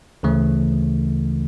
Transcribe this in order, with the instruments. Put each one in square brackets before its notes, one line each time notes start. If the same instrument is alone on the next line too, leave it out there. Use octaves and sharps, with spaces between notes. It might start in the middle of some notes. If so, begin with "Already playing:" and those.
[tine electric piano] D2 C#3 E3 A3